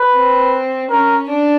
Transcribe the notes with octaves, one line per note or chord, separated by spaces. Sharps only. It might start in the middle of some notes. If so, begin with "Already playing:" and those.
Already playing: B4
C4
C#4 A#4
D4